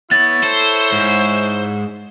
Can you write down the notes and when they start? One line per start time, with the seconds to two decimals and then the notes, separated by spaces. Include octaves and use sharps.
0.11 B3 E4 C#5 A6
0.43 A4 C5
0.92 G#2